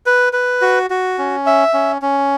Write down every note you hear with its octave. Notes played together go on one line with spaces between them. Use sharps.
B4
B4
F#4
F#4
C#4
E5
C#4
C#4